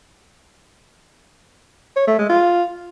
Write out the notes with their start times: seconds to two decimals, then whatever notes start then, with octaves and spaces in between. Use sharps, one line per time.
1.96 C#5
2.07 A3
2.18 G#3
2.29 F4